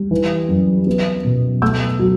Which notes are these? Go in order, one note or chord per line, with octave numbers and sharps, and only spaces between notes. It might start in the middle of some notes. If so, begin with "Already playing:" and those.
Already playing: G3
E3
F#2
B3
B2
A3 E6 G6
F#3